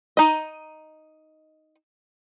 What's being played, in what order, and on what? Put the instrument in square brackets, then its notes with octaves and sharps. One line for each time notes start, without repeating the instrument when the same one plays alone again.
[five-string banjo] D#4 D#5